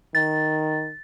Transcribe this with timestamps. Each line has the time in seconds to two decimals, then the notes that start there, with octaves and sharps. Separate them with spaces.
0.15 D#3 A6